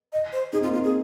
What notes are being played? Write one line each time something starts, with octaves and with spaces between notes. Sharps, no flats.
D#5
C5
D#4 G#4
C4 F4
A#3
F4
C4
G#4